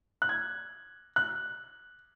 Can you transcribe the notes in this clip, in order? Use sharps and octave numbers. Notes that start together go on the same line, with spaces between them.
F#6
G#6
F#6